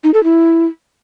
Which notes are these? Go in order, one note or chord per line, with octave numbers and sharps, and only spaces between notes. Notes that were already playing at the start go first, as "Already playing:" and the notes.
D#4
A4
E4